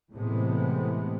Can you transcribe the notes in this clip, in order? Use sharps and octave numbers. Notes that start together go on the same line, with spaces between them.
A2 C3 E3 G#3 B3